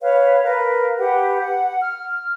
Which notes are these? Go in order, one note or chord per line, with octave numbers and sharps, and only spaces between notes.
B4 C#5 F5
A#4 B4 F5
G4 B4 F#5
F#5
F6